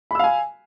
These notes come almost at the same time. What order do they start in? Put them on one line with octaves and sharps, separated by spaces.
B5 E6 F5 G#5